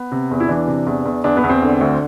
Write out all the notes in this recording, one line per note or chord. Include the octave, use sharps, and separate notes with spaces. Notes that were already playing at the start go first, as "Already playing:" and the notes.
Already playing: B3
C3
E2
E4
E3 D4
C3
E2
E2
E2 D4
B3
E2
C4
D3
D2